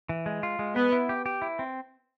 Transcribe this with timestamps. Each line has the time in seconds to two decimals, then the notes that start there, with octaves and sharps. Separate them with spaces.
0.09 E3
0.26 G#3
0.43 F4
0.59 G#3
0.76 B3 B4
0.92 E4
1.09 G4
1.26 G4
1.42 E4
1.59 C4